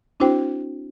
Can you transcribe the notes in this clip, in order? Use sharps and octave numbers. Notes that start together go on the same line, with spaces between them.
C4 D4 E4 F#4 C5 G5